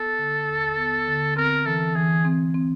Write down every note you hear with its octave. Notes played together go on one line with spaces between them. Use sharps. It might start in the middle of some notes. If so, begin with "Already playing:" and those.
Already playing: B3 A4
D3
D#2
B3
D3
C4 A#4
E3 A4
E3 G#4
C4
C4